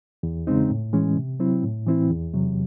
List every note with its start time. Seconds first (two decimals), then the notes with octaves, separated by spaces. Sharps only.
0.23 E2
0.47 C#3 G#3 C4 D#4
0.70 A2
0.93 E3 G#3 C#4
1.17 C3
1.40 F#3 C4 E4
1.63 A2
1.86 E3 C4 E4
2.10 E2
2.34 C3 F#3